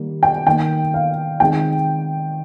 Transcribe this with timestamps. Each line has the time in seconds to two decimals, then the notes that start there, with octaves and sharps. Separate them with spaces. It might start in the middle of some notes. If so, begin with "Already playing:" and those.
Already playing: D#3 G3 A#3
0.23 G5
0.47 D#3 A#3 G5
0.94 F5
1.40 D#3 G#3 C4 G5